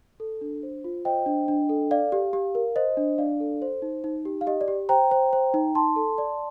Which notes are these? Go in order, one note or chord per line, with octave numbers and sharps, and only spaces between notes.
A4
D4
C5
F4
C5 D#5 G5
D4
D4
A4
D5 F5
G4
G4
A#4
C5 D#5
D4
D4 D5 F5
A4
C5
D#4
D#4
G4
F5
G4 D#5
D5
G4
C5 G5 A#5
C5
C5
D#4
D#4 A5 C6
A4
D5